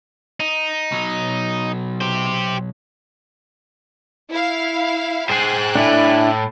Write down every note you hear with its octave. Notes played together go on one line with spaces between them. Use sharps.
D#4
B2 F#3
G4 C5
E4 F5
G#4 C5 G5 G#5 F#6
A2 D4 E4